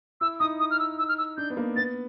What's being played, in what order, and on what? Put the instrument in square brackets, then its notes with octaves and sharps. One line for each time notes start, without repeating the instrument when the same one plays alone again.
[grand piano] E4 [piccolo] E6
[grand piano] D#4 [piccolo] D#6
[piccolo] D#6
F6
E6
E6
F6
E6
[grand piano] D4 [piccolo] G6
[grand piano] B3
A#3
[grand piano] B3 [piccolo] A6